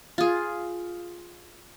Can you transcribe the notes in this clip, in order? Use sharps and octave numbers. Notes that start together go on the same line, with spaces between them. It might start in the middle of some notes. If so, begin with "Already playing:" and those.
F4 G#4